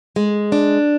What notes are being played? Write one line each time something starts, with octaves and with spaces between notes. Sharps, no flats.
G#3
D4